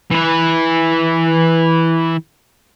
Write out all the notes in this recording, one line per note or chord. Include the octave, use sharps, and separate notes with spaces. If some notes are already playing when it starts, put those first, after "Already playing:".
E3 B4